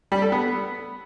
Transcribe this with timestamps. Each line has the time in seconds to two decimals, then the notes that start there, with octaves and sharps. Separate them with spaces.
0.12 G3
0.22 A4
0.32 B3